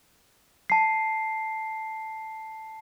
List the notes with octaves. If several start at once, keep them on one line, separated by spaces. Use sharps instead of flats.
A5 C7